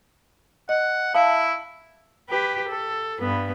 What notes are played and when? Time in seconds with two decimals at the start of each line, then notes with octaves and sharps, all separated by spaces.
0.69 D#5 F#5
1.15 E4 E5 F5 A5
2.29 G4 B4
2.70 A4
3.20 G2 B3